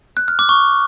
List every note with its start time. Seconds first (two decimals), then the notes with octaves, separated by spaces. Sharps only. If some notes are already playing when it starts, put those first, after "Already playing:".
0.17 F#6
0.28 F6
0.39 D6
0.49 C#6